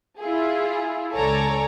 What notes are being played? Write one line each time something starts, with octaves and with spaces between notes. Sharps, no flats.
E4 F4 G#4
C#2 A4 C#5 D5 G#5 A#5